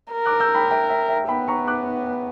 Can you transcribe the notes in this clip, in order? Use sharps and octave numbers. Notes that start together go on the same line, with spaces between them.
A#4
D6 F#6
E6 G6
G5 B5
E5 G5
E5 G5
E5 G5
B3 G5 B5
A#5 C#6
D6 F#6